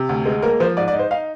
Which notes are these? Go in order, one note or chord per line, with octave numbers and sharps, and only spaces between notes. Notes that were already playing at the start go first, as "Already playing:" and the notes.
Already playing: C3
D2
G#3
A#3 A#4
F3 C5
G#2 D5
D5
D#4
C5
D#4 F5